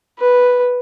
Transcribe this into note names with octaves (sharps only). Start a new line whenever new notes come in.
B4